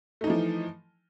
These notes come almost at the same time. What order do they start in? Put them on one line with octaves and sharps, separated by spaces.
A3 D#4 E3 F3